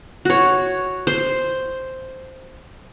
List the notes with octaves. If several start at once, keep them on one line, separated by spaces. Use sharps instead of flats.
F#4 C#5
C5